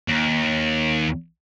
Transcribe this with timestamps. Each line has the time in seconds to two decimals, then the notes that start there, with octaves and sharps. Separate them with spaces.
0.08 D#2